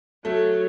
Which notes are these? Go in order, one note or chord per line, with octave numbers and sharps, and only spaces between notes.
F#3 A3